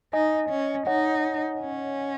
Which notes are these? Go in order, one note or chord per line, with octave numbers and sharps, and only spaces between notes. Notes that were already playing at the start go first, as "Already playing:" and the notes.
D#4 D#5 G#5
C#4
D#4 C#5 F#5
C#4